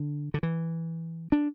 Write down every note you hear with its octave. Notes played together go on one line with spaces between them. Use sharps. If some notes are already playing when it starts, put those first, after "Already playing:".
Already playing: D3
D3
E3
D4